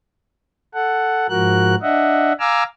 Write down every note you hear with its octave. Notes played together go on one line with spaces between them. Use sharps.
A4 F#5
G#2 F3 F#4 A#4 F#6
D4 D#5 E5 F#5
F5 G#5 A#5 D6 E6 F6